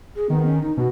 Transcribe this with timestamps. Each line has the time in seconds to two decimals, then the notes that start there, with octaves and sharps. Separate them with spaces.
0.16 G#4
0.30 D#3 B3
0.45 C#4
0.61 D#4
0.77 B2 F#4